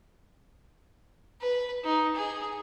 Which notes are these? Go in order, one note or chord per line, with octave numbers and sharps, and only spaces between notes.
B4
D#4
G#4